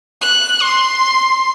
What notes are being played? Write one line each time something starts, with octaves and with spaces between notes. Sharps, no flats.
F#6
C6